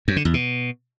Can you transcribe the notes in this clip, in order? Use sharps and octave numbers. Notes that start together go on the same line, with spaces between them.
F#2
D3
E2
B2